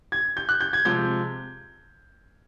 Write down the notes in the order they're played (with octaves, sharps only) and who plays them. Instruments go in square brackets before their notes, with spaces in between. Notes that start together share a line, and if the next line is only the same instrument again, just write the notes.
[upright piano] G#6
G6
F#6
G6
G#6
[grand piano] C3 F3 G#3 [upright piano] G6